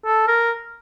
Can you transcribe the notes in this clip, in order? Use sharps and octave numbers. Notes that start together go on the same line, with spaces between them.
A4
A#4